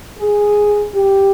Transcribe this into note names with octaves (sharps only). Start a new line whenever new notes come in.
G#4
G4